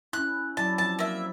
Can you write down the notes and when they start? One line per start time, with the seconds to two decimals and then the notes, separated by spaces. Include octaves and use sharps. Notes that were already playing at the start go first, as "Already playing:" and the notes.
0.13 C#4 E4 F#6
0.57 F#3 E4 D5 A5
0.78 F3 C4 A5
0.99 A#3 E5